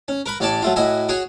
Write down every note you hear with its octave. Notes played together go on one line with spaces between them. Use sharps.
C#4
A#4 B4 B5
A1 C#4 C#5 D5 A5
F#3 A3 F4
A2 F#4 D#5 E5 G#5
F#4 G#4 C#5 G#5